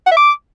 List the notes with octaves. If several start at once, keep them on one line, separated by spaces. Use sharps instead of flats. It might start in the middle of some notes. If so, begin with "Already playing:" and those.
F#5
E5
D6